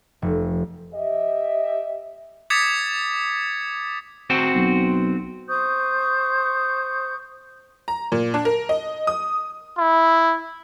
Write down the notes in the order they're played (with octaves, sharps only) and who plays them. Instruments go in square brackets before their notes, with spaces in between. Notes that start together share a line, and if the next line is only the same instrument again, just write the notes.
[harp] F1
[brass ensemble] G4 D#5 E5
[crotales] D6 D#6 G#6 A6 B6 C#7
[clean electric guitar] C4 F#4 C5
[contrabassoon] B1
[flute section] C5 C#6 D#6 G6
[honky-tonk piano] A#5
A#2
D4
A#4
D#5
D#6
[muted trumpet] E4